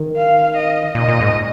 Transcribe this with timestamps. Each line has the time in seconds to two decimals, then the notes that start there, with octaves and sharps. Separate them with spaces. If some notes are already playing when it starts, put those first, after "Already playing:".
Already playing: D#3
0.17 F5
0.56 D#5
0.95 A#2 D#5
1.08 A#2
1.21 G#2